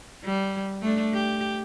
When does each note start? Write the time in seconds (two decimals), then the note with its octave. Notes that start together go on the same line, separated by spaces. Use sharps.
0.24 G3
0.81 A3 D4
1.14 G4